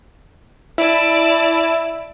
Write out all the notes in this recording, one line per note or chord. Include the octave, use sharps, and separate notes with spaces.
E4 D5 A5